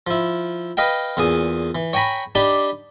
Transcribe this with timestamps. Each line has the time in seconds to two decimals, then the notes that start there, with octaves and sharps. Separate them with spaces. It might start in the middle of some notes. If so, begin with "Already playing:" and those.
0.07 F3 E4
0.77 B4 D#5 F5 G5
1.17 E2 A#2 G#4 D#6
1.75 E3
1.93 C#5 G5 G#5 A#5 B5
2.35 D4 D#4 G4 D5 B5